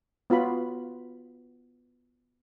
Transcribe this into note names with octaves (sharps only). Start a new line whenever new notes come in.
B3 F4 F#4 B5